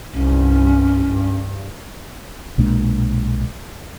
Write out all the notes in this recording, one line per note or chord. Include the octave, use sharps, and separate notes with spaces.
C2 G2 C#4
G2
B1 A#2 G#3 D4